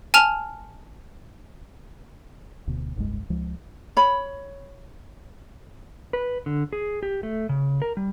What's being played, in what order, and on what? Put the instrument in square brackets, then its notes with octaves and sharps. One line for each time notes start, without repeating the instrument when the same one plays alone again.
[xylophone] G#5 A5 F6 F7
[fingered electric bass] D1 D2 B2
F1 C2 G2 G#3
C#2 F3 G#3
[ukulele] C#5 B5
[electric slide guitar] B4
D3
G#4
G4
A3
C#3
A#4
G3